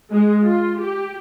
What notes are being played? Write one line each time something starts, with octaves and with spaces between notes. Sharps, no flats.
G#3
F4
G4